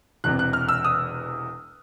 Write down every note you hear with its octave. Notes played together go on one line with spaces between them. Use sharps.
E1 E2 C3 F#6
F#6
F6
E6
D#6